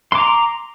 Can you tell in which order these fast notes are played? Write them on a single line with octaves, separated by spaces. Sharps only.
C6 D6 A#5